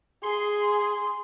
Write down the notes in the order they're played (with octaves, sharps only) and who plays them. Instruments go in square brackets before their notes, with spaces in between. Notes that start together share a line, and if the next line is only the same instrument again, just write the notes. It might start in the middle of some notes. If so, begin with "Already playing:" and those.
[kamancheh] G#4 [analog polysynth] C6